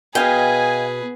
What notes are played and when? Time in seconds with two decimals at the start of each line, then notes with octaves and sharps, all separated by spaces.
0.15 B2 G#4 B4 D#5 F5 G5 G#5